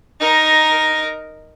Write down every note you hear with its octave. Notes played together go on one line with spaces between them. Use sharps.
D#4 A#4